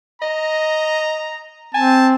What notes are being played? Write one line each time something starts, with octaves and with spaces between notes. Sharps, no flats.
D#5 A#5
C4 G#5 A5